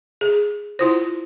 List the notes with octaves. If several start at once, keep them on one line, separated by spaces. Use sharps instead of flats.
G#4
E4 F4 C5